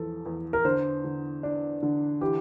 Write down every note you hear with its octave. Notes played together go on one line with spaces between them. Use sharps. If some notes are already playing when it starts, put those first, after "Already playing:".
Already playing: E2 F3 A4
E2
A#4
D3 C5
D3
D4
D3
E3 G4